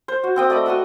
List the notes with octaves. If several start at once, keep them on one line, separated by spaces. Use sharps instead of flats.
C5
F#4
C4 G5 D#6
A3 D5 D#5 B5
F#4 B4 C6 C#6